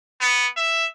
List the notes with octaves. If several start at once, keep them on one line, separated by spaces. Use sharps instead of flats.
B3
E5